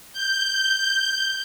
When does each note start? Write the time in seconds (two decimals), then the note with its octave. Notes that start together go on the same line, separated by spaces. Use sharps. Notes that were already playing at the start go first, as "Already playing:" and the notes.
0.13 G6